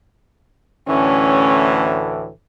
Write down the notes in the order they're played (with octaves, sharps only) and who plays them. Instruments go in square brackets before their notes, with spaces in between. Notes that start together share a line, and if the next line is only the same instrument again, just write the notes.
[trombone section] D2 A2 E3 [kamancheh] C#4